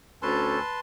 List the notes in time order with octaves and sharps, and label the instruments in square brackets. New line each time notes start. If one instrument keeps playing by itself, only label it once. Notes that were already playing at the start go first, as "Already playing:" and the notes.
[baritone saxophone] D2 [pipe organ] C#4 A4 [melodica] B4 A5 C6